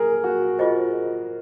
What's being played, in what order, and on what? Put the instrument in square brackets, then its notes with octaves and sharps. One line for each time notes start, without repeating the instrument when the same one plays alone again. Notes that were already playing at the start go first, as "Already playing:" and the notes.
Already playing: [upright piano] G#4 A#4
F#4
[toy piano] F4 G#4 C5 D#5